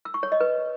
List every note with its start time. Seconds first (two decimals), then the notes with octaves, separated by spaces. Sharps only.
0.05 E6
0.14 C#6
0.23 C#5
0.32 D#5
0.41 B4